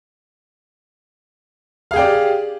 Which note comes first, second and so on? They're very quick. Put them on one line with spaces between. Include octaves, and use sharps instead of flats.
F5 G#4 G5 D5 G4